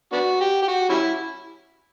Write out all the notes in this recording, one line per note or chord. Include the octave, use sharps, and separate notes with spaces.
B3 D4 F#4
G4
G4
F#4
G3 C#4 E4